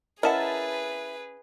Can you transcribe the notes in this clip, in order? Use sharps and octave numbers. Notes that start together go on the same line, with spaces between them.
C#4 E4 G#4 A#4 B4 D#5 F#5 A5